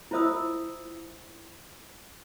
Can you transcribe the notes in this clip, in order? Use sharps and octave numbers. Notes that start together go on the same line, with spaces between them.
E4 F4 C5 E5 D#6 E6